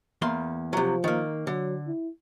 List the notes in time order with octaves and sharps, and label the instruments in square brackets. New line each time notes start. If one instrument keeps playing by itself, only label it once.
[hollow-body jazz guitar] E2 A#3 C6
[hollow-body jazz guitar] C3 F#3 [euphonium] F3
[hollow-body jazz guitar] D#3 A#3
[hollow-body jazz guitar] D3 [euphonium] F#3
[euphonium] E4